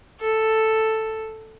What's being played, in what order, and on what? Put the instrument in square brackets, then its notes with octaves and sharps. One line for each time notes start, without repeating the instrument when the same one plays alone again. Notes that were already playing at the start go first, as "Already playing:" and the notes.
[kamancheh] A4